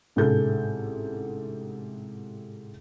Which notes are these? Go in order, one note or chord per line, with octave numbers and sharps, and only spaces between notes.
A1 G#2 C3 G#4 A4 G6